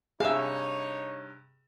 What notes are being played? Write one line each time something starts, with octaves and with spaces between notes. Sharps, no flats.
G2 C3 D#4 G#4 C#5 E5 F5 E7